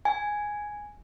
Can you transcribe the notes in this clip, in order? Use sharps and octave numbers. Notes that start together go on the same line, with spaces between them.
G#5